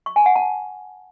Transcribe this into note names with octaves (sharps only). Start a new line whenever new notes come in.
C#6
G#5
F#5
A5